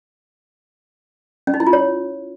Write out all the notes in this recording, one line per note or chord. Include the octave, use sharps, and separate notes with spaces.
C#4
D#4
E4
F4
C#5